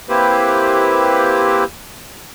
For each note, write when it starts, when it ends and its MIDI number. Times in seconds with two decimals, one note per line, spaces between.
0.09 1.64 58
0.09 1.64 60
0.09 1.64 64
0.09 1.64 67
0.09 1.64 71
0.09 1.64 72